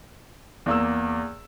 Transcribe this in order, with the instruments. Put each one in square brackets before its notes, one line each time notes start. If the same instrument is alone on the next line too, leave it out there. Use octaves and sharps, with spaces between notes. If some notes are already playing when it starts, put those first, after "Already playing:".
[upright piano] E2 A#3 E6